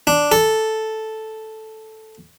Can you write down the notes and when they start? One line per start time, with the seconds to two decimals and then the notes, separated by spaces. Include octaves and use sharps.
0.07 D4
0.32 A4